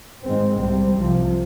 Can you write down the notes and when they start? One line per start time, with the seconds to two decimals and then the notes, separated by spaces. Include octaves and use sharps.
0.26 G#2 D#3 G#3 C4
0.62 C2 C3 G3 C4
0.98 C2 C3 F3